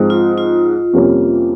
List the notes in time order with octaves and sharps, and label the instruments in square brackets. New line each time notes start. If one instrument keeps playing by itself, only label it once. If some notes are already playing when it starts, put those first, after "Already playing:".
Already playing: [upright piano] G#2 F3 G#3 C4
[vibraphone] F4
F4
[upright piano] F2 C3 G3 A#3 C#4